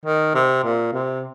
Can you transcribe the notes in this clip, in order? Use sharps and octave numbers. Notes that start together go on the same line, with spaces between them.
D#3
C3
A#2
C3